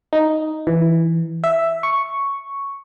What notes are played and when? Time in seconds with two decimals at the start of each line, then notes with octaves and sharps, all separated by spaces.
0.13 D#4
0.67 E3
1.44 E5
1.83 C#6